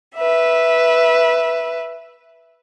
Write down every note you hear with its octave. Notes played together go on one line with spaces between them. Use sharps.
B4 E5